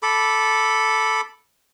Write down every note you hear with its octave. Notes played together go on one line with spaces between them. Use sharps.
A4 B5 D6